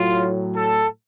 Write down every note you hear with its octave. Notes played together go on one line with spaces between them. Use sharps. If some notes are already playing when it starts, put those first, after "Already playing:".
Already playing: A2 F#3 F4
A4